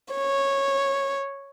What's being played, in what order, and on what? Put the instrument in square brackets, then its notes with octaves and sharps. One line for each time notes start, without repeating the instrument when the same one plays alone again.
[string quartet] C#5